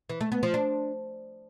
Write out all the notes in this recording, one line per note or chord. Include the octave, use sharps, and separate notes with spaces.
E3
A3
B3
F3
D4